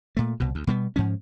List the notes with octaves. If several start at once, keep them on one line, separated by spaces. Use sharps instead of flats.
A#2 A3
C2 B2
D2
B2 G3 B3
G#2 F3 C#4